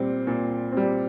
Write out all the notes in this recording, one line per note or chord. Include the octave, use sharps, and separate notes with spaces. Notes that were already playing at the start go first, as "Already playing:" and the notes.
Already playing: A#2 G3 C4
A#2
G3 C4